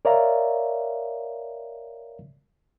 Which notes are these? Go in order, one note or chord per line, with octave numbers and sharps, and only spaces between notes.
A#4 C#5 D5 E5 F5 A#5